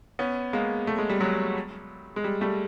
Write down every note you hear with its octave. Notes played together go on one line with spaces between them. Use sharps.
B3 C#4
G#3 A#3
A3
G#3
G3
F#3 G#3
G#3
G3
G3 A3